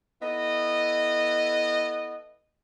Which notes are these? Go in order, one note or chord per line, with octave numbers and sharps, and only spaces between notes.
B3 E4 A4 D#5